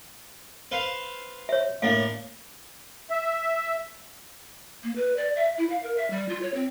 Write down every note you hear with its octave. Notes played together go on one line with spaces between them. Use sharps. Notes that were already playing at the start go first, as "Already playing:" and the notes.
B4 C5 F5
C#5 E5
A2 A#3 D4 F5
E5
A#3
B4
D5
E5
E4
F5
A#4
E5
G3
F4
C#5
C4